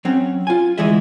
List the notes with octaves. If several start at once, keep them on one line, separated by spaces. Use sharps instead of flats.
F#3 C4 C#4
F4 G#5
D2 E3 G#3 G#4 D#5 E5